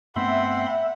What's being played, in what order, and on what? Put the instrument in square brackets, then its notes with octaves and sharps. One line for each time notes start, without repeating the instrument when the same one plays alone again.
[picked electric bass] G2 A3 B3 [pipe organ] C4 B5 C6 [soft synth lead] E5 [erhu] F#5